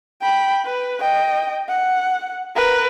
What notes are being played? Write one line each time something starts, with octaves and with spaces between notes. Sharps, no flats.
G5 B5
B4
D#5 G5
F#5
A#4 B4